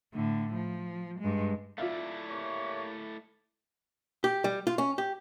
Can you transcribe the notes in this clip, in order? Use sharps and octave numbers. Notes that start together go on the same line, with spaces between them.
A2 D3
F3
G2 G#3
A3 E4 F4 D5 E5 F5
A#3 G4 C#5
G4
G3
F4
C#4
G4